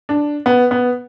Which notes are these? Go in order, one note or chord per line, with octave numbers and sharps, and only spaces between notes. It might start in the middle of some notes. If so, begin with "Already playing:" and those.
D4
B3
B3